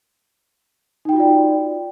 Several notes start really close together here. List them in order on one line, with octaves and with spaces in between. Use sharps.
D#4 G5 F#4 F4 D5